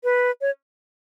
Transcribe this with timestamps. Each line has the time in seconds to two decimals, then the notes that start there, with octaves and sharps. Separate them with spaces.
0.04 B4
0.41 C#5